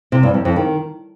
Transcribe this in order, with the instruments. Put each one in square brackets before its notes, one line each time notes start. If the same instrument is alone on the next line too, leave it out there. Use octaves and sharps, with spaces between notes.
[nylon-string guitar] C3
G2
F2
F2
D#3